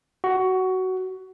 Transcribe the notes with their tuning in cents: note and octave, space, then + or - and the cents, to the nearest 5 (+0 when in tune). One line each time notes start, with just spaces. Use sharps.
F#4 +15